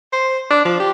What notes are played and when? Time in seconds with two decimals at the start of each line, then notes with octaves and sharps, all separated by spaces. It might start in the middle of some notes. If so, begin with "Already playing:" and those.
0.13 C5
0.51 D4
0.65 F3
0.80 G4